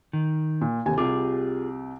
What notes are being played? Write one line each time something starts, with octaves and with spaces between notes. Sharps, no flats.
D#3
A#2
F1 D#2 G#5
C2 F4 G4 G#4 D6